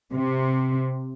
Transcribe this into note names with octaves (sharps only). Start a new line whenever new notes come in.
C3